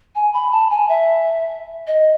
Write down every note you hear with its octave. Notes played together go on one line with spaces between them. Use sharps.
G#5
B5
A5
G#5
E5
D#5